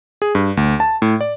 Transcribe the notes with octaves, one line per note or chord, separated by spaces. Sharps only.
G#4
G2
D2
A5
A2
D5